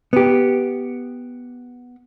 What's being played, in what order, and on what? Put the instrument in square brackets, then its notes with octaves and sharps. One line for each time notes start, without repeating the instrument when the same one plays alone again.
[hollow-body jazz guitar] B3 G4